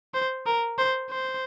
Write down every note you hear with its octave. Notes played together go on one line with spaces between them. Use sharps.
C5
A#4
C5
C5